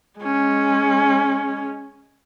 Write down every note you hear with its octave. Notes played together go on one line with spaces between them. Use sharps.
G#3 C#4